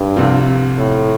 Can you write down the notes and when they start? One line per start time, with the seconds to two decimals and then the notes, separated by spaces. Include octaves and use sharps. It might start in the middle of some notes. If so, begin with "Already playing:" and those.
Already playing: G2
0.16 C2 C3 F3 C4 F4
0.78 A2